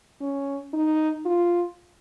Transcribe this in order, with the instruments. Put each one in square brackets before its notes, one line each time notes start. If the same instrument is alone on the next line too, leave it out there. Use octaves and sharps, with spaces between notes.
[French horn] C#4
D#4
F4